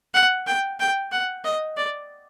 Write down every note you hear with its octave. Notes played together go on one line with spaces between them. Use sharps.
F#5
G5
G5
F#5
D#5
D5